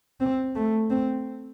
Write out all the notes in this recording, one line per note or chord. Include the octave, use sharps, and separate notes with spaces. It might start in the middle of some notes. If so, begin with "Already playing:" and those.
C4
A3
C4